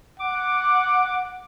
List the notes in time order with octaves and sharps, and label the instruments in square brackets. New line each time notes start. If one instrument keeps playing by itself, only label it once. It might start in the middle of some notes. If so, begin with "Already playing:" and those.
[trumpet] F#5 [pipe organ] D6